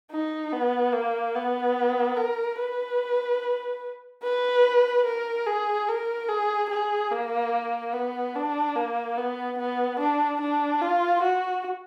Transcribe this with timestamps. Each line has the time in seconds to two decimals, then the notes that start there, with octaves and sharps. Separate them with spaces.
0.11 D#4
0.53 B3
0.94 A#3
1.35 B3
2.17 A#4
2.59 B4
4.23 B4
5.06 A#4
5.47 G#4
5.89 A#4
6.29 G#4
6.70 G#4
7.12 A#3
7.94 B3
8.35 D4
8.76 A#3
9.17 B3
9.59 B3
10.00 D4
10.41 D4
10.82 F4
11.23 F#4